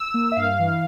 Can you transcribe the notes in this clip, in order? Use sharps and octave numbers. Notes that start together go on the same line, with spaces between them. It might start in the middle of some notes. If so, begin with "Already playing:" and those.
Already playing: E6
A#3
E5
G2 F5
E3